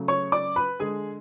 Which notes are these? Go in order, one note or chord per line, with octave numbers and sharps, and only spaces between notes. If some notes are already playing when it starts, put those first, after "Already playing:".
Already playing: C#3 F#3 A3
C#5 C#6
D5 D6
B4 B5
D3 G#3 G#4 G#5